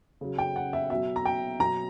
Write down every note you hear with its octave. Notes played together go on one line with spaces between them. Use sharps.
C#3 F#3
G5
F#5
E5
B2 F#3 E5
A#5
G5
B2 F#3 A#5